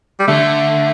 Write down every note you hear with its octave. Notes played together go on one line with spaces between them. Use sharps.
G3
D3 A3